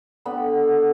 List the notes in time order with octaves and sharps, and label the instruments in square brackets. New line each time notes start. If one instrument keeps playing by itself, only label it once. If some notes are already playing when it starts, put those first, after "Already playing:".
[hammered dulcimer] D3 B3 G4 B5